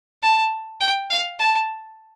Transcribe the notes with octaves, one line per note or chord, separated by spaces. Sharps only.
A5
G5
F5
A5